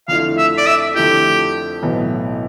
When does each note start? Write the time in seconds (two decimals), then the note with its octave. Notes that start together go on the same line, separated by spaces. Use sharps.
0.08 F2 D3 A3 E4 F5
0.38 E5
0.58 D5
0.66 E5
0.96 F2 D3 A3 E4 G4
1.83 B1 A2 E3 B3